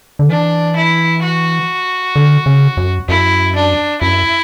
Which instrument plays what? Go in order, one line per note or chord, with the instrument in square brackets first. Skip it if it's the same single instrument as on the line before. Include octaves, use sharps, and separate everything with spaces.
[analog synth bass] D3
[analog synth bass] E3 [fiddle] D4
[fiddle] E4
F#4
[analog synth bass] D3
C#3
F#2
[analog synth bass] F#2 [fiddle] E4
[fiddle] D4
[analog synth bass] F#2 [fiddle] E4